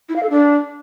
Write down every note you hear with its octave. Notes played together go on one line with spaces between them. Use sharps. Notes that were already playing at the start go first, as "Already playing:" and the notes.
E4
F5
A4
D4